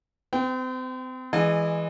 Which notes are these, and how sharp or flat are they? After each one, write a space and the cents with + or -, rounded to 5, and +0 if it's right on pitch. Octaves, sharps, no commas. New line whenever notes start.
C4 -35 G5 -5
E3 +0 G#3 +0 D#5 -35